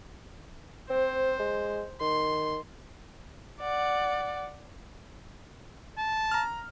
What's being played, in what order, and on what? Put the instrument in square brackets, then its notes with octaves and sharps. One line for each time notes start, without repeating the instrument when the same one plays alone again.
[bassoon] C4 [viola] C5
[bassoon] G#3
[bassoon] D#3 [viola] C6
[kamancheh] D5 F#5
[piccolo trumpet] A5
[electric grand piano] A#5 F6